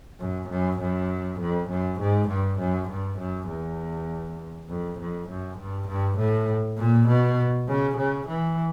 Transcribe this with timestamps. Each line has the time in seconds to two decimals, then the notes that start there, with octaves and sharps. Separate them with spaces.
0.20 F#2
0.49 F#2
0.80 F#2
1.39 F2
1.69 F#2
2.00 G#2
2.28 G2
2.59 F#2
2.89 G2
3.19 F#2
3.49 E2
4.68 F2
4.99 F2
5.28 F#2
5.58 G2
5.88 G2
6.18 A2
6.78 A#2
7.07 B2
7.68 C#3
7.97 C#3
8.27 E3